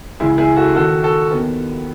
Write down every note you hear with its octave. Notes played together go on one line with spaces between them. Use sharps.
C#2 C#3 E3 E4 G#4
E4 G#4
F#4 A4
D#2 D#3 F#4 A4
F#4 A4
D#2 D#3 B3